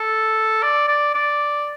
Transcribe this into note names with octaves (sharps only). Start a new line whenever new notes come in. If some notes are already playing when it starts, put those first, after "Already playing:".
Already playing: A4
D5
D5
D5